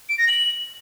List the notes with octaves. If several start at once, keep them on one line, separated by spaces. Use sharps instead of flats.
D7
A#6
F#7